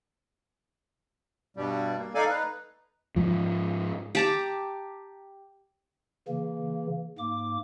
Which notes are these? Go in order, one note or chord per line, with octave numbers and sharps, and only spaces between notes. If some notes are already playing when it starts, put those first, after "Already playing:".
G2 B2 G3
A#3
D#4 A4 D5 F5 G#5
D#4 B4
G#2 F3
G4 A5 A#5
C#3 E3 A#3
G#2 A#3 D6